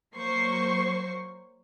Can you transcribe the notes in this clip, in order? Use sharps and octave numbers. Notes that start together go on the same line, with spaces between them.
F#3 A#3 C5 C#6 C7